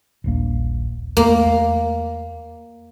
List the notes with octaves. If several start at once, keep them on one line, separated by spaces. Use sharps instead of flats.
D#1 A#1 A#3
E2 A3 A#3